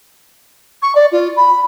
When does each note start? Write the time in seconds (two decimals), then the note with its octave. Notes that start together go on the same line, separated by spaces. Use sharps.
0.82 C#6
0.95 D5
1.12 F4
1.36 B5